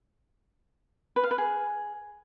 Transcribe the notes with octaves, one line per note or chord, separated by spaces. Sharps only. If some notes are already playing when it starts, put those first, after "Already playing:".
B4
F5
B4
G#4